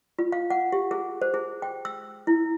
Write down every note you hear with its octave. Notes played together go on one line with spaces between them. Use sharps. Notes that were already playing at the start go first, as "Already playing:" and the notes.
F4
F5
F#5
G4
G#4
C5
G#4
G5
E6
E4